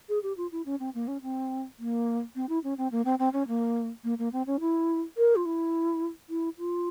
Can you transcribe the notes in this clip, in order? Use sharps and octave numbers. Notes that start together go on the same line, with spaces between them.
G#4
G4
F4
E4
C#4
C4
A#3
C#4
C4
A#3
C4
E4
C#4
C4
A#3
C4
C4
C#4
A#3
A#3
A#3
C4
C#4
E4
A#4
F4
E4
E4
F4